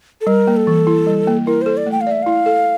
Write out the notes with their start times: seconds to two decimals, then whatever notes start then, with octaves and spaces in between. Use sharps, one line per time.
0.21 A4
0.27 G3 A#4
0.47 A#3
0.56 A4
0.67 E3
0.87 E4
1.07 G3
1.27 A#3
1.46 E4 A#4
1.62 A4 C5
1.77 D5
1.86 A3
1.92 G5
2.01 F5
2.07 D5 E5
2.22 E4 F5
2.46 A4